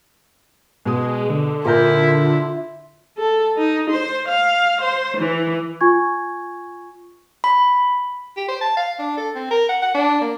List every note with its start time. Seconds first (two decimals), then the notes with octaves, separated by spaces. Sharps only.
0.85 B2 G#3 D#6
1.30 D3
1.65 A#2 E4 F4 A#4 G6
3.18 A4
3.57 D#4
3.90 C5
4.29 F5
4.81 C5
5.17 E3
5.81 F4 G#5 C#6 G#6
7.44 B5
8.37 G4
8.49 C5
8.61 A5
8.77 F5
8.99 D4
9.17 A4
9.35 C4
9.51 A#4
9.69 F#5
9.82 F#5
9.94 D4
10.21 A#3